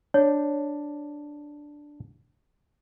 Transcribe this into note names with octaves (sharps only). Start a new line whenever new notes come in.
D4 C#5